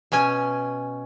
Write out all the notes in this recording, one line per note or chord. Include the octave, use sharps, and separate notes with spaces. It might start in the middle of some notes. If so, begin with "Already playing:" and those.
B2 C#4 G#5